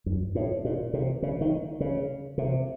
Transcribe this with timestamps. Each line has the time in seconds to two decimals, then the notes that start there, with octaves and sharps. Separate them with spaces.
0.06 F#2
0.35 A2
0.65 A#2
0.93 C3
1.22 C#3
1.41 D#3
1.80 C#3
2.38 C3